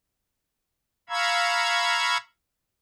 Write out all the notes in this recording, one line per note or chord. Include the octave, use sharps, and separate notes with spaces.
F5 A#5 B5 C#6 E6 G#6